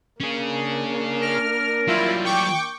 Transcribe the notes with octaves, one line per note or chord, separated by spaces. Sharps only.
A#3 C#4 D4 G#4
A#4 F6
F#3 G3 E4 F4
G5 C#6 D6